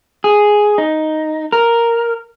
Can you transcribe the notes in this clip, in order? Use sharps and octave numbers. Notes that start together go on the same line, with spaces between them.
G#4
D#4
A#4